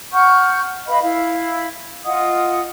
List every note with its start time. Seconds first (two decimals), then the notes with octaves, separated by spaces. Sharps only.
0.13 F#5 C#6 F6 G6
0.87 B4 D#5 F5 B5
1.01 E4 F5
2.05 F4 D#5 F#5 D#6